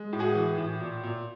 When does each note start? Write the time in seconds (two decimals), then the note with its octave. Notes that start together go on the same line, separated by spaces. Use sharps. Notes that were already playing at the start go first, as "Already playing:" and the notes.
Already playing: G#3
0.13 A2
0.19 F#4 G#4
0.35 E3
0.58 A2
0.80 A#2
1.03 A#2